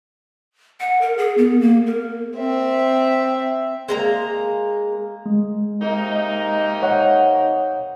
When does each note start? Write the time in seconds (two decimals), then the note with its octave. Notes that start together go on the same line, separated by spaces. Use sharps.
0.80 F#5
1.01 A#4
1.17 G#4
1.38 B3
1.61 A#3
1.87 A#4
2.37 C4 E5
3.88 G#3 A#3 A#5
5.26 G#3
5.81 C3 A#3 D#4
6.83 C#5 F#5